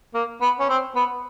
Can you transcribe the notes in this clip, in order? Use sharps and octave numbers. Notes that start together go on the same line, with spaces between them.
A#3
B3
C#4
C4
B3